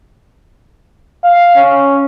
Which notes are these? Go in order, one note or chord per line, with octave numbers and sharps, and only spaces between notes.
F5
C#4